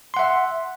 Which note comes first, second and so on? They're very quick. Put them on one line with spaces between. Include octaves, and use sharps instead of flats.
C6 F#5 E5